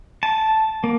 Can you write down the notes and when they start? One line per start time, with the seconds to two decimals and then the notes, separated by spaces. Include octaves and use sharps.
0.23 A5
0.84 A#3